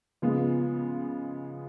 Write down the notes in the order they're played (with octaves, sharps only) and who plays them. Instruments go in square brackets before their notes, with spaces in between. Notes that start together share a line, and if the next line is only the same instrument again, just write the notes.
[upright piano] C#3 F3 G#3 B3